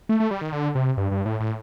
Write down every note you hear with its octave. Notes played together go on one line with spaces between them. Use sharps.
A3
A3
G3
D#3
D3
C3
G2
G2
A2
A2